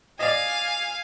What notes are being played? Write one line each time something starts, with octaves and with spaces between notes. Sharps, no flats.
D5 D#5 F5 G#5